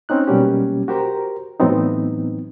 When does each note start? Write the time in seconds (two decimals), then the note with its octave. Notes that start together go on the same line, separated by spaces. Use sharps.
0.09 C4 C#4 D#4 F#6
0.27 B2 F#3 G3 A#3 C#4 G4
0.88 F#4 G4 A#4 C5 A#5
1.60 A2 E3 F#3 B3 C4 D#4